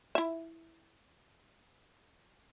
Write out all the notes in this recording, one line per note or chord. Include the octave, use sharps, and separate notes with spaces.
E4 E5